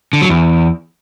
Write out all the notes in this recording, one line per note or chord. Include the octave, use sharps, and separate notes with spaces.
D3
F#3
E2